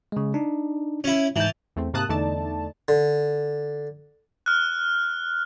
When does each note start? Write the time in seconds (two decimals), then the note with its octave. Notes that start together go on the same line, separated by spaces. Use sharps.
0.12 C#3 G#3
0.34 D4 D#4
1.04 C#4 E4
1.36 G#2 E3 A5 G6
1.76 E2 A3 C4
1.94 G#2 C3 A#3 A5 D#6 F#6
2.09 E2 D3 A3 D#4 D5 A5
2.88 D3
4.46 F6 F#6